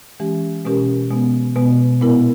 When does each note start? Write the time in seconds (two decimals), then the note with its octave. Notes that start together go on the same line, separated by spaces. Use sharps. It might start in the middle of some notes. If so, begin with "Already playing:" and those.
0.20 E3 G#3 C#4 G4
0.65 B2 G#3 C#4 G4 A#4
1.10 B2 G#3 B3
1.56 B2 G#3 B3
2.01 A#2 G#3 B3 E4 A#4